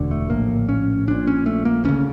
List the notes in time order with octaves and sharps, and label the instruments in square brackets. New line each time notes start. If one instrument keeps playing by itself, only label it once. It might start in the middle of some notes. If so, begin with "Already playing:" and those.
Already playing: [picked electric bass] E1 D2 D3
A3
A#1 A2 A#3
C#4
A#1 A#2 D4
C#4
A3
A#3
D2 C#3 C#4